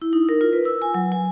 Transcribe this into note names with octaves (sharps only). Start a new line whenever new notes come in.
E4
D#4
A#4
F4
B4
E6
G#5
F#3
G#5